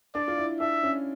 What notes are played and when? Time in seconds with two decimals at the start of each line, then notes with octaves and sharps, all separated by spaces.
0.15 D4 D5
0.28 F4
0.38 E4
0.60 D4 E5
0.83 C#4